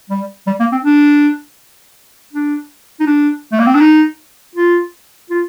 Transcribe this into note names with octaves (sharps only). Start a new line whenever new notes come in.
G3
G3
A#3
C4
D4
D4
D#4
D4
A3
A#3
C4
D4
D#4
F4
F4